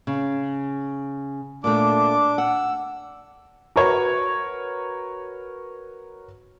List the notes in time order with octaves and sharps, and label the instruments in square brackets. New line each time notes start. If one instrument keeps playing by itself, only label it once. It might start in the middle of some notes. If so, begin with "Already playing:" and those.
[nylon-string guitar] C#3
[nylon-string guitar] A#2 A3 [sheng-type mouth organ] D4 D6
[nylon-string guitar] F#5 [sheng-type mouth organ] E6
[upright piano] F#4 A#4 B4 C#5